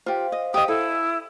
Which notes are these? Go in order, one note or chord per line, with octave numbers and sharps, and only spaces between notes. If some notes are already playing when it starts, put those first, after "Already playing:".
F4 G4 C5 F5
D#5
G4 D#5 D#6
E4 A4